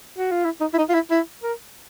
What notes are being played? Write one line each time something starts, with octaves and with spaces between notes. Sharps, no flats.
F#4
F4
E4
D#4
E4
D#4
F4
E4
E4
A#4